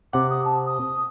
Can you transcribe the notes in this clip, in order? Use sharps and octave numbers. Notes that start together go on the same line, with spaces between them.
C3 F#5 D6
D#6
A5
D#6